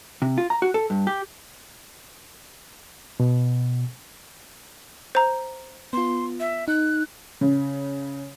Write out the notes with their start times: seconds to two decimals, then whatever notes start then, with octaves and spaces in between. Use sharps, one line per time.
0.22 C3
0.38 F4
0.50 A#5
0.62 F#4
0.74 A4
0.90 G2
1.07 G4
3.20 B2
5.15 C5 A#5
5.93 B3 F4 C6
6.40 E5
6.68 D#4 F#6
7.41 C#3